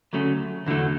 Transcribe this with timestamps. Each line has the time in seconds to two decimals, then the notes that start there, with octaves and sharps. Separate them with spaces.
0.13 D2 C#3 F#3 A3 C#4
0.66 E2 D3 F#3 A3